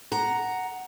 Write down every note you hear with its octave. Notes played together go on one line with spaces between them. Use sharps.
F#5 A#5